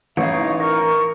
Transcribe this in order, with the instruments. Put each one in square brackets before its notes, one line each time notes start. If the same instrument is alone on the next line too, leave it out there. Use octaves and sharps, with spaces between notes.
[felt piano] A1 [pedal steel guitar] E3 D#4 [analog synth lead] C#5 [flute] F5
[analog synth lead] A#4 [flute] C#6